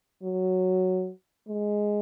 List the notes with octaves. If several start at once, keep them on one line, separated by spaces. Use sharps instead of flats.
F#3
G#3